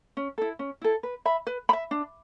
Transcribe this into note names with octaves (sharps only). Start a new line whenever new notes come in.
C#4
E4 A4
C#4
E4 A4
B4
E5 B5
B4
B5
E5
D4